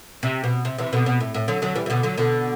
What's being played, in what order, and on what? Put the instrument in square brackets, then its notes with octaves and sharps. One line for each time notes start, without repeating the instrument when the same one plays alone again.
[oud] C3
B2
C3
C3 E3
B2 D3
B2
A2
A2
D3 F#3
D3 F#3
E3 G3
E3
B2 D3
D3 F#3
B2 D3